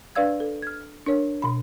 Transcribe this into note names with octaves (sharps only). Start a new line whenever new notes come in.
D4 B4 D5 F5 E6 G#6
A4
F6 G#6
D4 A#4 C#5
B2 B5